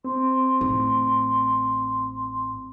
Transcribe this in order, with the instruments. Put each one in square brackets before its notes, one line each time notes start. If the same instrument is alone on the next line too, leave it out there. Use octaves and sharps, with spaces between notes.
[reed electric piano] C4 [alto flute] C6
[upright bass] A1